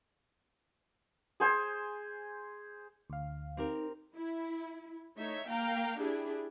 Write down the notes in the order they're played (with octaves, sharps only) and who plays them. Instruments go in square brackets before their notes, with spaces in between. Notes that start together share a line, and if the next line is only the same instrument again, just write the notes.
[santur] G#4 C5 G#5
[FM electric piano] D2 F5
[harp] C4 G4 A#4 [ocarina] D#4
[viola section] E4
A3 D#4 C#5 E5
A#3 F5 G5 A#5
D4 E4 G4 G#4